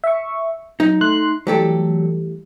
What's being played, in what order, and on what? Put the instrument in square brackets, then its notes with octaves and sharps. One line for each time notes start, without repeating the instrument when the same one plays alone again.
[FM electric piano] E5 C#6
[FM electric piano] F#3 [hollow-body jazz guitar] D#4
[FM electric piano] A3 C6 F#6
[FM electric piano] E3 G3 A3 [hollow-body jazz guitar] F#3 G4 A4